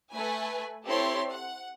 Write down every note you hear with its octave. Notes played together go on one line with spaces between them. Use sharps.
A3 B4 G#5
C4 E4 G4 A4 C#5 C6
F#5